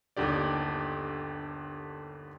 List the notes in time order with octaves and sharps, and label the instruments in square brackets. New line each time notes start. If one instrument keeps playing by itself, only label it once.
[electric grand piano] G1 D#2 D3 G4 D5